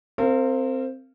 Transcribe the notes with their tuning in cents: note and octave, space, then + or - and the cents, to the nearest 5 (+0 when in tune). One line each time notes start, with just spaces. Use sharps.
C4 +0 A#4 -35 F5 -15